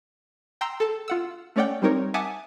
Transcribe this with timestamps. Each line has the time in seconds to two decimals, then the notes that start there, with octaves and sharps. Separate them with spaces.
0.61 G5 A#5 C6 E6
0.80 A4 A5
1.08 F4 F#5 E6
1.56 A3 C#4 C#5 D5 F#5 G5
1.82 G3 C4 D#4 A#4 C#5
2.14 E5 F#5 G#5 A5 D6 D#6